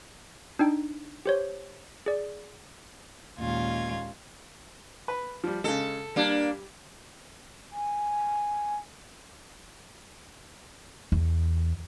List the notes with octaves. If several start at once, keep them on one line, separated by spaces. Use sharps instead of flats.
D4 D#4 G5
G4 C5 C#5
G#4 D5
D#2 A#2 G#3 C#4 F4 G#6
B4
F3 G3
C#3 G#3 A4
G3 A#3 D4
G#5
E2